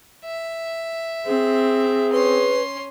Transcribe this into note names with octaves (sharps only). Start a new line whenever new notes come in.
E5
C4 G#4
C#4 B4 C6